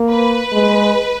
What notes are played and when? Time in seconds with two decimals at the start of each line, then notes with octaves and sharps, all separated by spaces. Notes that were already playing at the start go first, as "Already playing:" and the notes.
Already playing: A#3
0.09 B4
0.53 G#3